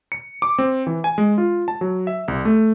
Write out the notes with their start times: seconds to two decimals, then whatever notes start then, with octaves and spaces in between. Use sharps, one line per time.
0.12 C#7
0.42 D6
0.58 C4
0.87 E3
1.04 G#5
1.18 G#3
1.38 F4
1.68 A5
1.81 F#3
2.07 E5
2.28 C2
2.45 A3